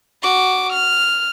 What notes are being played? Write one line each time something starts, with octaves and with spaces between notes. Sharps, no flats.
F#4 D6
F6